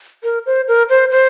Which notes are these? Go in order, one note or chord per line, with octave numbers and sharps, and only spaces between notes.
A#4
C5
A#4
C5
C5